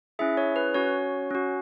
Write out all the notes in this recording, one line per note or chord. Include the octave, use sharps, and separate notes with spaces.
C#4 E4 G#4 E5
C#5
B4
C#4 F#4 C#5
C#4 F#4